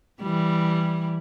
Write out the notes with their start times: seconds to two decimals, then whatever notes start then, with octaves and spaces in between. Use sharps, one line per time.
0.21 E3 G3